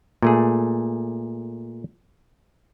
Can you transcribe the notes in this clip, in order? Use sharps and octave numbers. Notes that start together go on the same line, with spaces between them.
A#2 A3 G#4